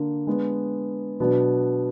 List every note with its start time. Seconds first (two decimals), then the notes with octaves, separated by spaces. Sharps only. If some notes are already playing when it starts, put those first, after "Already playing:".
Already playing: D3 A#3 D4
0.27 G#3 B3 D4
1.20 B2 F#3 B3 D4 F#4